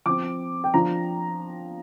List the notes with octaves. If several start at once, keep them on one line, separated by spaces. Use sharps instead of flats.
F3 C4 D6
G5
F3 D4 A#5